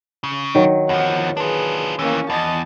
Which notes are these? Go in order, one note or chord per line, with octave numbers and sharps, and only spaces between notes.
C#3
D#3 F#3
E2 F3 F#5
D4 F4 G#4 B4
D#2 E3 A#3 C#4
E2 D#5 A5